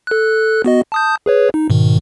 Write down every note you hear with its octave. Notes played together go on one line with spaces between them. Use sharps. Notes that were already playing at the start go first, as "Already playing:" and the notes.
A4 F#6
B3 F#4 D#5
A5 D#6 G6
G#4 B4 C#5
D#4
G#2 B2 D#3